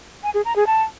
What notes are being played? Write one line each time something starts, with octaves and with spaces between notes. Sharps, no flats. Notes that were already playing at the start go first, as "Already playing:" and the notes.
G#5
G#4
A#5
G#4
A5